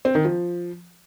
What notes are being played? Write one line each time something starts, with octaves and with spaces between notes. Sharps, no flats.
C4
D#3
F3